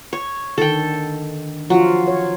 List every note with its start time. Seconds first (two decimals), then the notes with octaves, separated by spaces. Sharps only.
0.13 C#5
0.58 D3 D#3 A4 G5
1.70 F3 F#3 F4
2.08 C#5